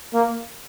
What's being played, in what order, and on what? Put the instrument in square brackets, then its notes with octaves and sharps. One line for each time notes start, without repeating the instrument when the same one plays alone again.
[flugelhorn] A#3